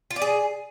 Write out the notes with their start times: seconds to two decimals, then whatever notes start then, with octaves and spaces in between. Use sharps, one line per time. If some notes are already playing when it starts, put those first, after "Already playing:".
0.11 F4
0.16 D5
0.22 G#4